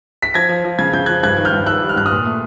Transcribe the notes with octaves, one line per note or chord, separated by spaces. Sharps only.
B6
F3 G#6 A#6
F3
F3
C#3 G#6
C#3 G6
F3 F#6 G#6
G2 F#6 G#6
D#3
F6 G6
G2
D#3 E6 F#6
G3
F6
G2 F#6
D#6 F6
A#2
A3